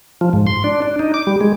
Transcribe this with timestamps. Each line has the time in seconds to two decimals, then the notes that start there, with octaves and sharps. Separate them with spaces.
0.21 F3
0.33 G#2
0.47 C6
0.64 D4
0.82 D4
0.99 D#4
1.14 D6
1.27 G3
1.41 G#3